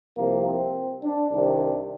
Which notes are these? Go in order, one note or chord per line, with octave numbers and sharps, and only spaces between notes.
C2 C3 F3 A#3
C4
D4
C2 C3 D#3 D4